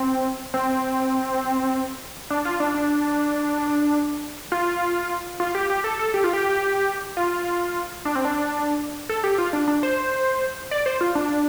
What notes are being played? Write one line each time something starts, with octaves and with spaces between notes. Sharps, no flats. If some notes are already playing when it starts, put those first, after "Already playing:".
Already playing: C4
C4
D4
F4
D4
D4
F4
F4
G4
G4
A4
A4
G4
F4
G4
F4
D4
C4
D4
A4
G4
F4
D4
D4
C5
D5
C5
F4
D4